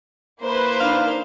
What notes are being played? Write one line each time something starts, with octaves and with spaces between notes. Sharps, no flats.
A#3 E4 B4 C5
D4 D#4 F5